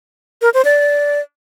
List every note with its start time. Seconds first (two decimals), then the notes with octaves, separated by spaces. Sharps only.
0.42 A#4
0.54 C5
0.65 D5